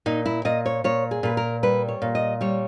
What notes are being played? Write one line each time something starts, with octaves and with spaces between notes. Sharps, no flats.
A#2 D#4
E4
A#2 D#5
C#5
A#2 C#5
G#4
A#2 B4
A#4
G3 B4
C#5
A#2
D#5
G3 C#5